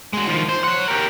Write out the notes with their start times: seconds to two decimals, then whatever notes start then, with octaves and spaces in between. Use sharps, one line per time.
0.13 G#3 F#4
0.27 D#3 F3
0.49 C5
0.64 C#5 F#5
0.88 G4 A#4